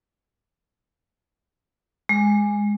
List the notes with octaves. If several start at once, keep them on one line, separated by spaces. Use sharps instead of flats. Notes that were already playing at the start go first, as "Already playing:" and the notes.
G#3